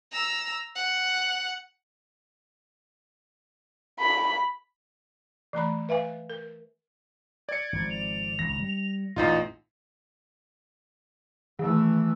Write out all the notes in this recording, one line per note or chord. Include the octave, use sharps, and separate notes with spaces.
A#5 E6
F#5
B5
E3 A3 A#5 B5
B4 E5 F5 G#5
A#4
D5 G#6 C#7
G#1 C3 F3 G#6
F7
G#1 C#2 A#6
G3
A1 E2 A#2 E3 D#4 F4 A6
D#3 E3 A3